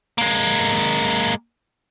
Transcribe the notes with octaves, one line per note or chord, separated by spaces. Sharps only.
G#3 A#3